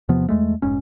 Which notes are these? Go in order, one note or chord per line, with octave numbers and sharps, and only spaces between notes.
E2 C3 F3 B3
E2 G#3 A3
F1 G#2 C#4